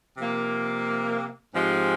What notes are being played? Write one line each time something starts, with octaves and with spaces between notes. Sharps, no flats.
C3 F3 A#3
G#2 F3 G#3 C4 G4